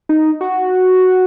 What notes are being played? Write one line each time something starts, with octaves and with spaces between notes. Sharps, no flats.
D#4
F#4